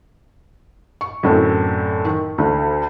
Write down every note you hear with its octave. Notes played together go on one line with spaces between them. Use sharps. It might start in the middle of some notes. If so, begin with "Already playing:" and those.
C#6
F#2 A2 D3 C4
D#3
D2 D3